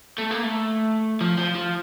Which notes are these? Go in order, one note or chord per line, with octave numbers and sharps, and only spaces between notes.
A3
A#3
A3
F3
F3
F3